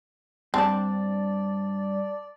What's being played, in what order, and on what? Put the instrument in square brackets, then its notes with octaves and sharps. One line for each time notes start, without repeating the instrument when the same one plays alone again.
[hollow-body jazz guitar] G2 [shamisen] C4 D4 [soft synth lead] D5 [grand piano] A5